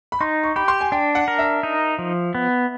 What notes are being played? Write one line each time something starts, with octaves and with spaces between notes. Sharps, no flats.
B5
D#4 C6
C#6
G4 B5
C6
G#5
D4 G5
F#5
A#4
E5
D#4
F3
B3